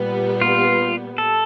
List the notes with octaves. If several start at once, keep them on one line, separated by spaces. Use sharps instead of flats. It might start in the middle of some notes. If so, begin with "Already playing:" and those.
Already playing: A#2 G3 B3
F4
A4